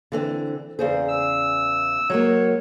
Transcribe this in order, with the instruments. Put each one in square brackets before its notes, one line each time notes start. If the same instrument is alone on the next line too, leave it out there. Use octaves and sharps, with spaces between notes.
[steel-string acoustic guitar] D3 E3 C4
[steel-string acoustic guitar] E2 C#3 G#4 [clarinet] C5
[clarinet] E6
[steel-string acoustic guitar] F#3 G#3 A#3 [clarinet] C#5